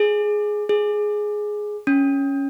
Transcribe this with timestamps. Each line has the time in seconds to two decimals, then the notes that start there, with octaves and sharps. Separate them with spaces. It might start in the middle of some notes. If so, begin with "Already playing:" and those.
Already playing: G#4
0.69 G#4
1.87 C#4